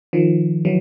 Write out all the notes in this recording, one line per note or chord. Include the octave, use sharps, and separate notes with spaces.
D#3 F3
E3 F#3